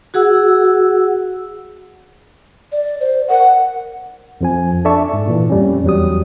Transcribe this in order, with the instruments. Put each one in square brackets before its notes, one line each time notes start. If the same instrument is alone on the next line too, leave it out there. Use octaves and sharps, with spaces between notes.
[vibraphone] F#4 G#4 F#5 E6
[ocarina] D5
C5
[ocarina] A#4 [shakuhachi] F#5
[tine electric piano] F2 F3 G#5
D4 A4 D5 E5 A5 C#6
G#2
A#2 E3
F2 G3 C#4
E2 F#3 G3 D#6